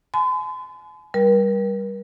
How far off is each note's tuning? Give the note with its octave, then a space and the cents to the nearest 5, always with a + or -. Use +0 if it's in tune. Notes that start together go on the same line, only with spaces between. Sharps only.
G#5 +40 C6 -45
G3 +0 A#4 +45